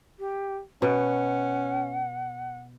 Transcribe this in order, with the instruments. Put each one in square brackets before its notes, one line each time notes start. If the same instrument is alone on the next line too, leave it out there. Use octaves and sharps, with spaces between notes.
[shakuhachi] G4
[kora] B2 [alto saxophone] C#4 [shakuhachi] F#5